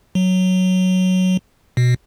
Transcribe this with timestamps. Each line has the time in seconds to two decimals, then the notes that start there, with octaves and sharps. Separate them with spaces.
0.15 F#3
1.77 B2